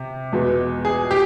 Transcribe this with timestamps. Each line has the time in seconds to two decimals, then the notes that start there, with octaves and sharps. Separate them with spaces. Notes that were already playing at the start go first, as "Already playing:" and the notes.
Already playing: C3
0.32 E2 B2 G#3
0.85 G#4
1.11 G4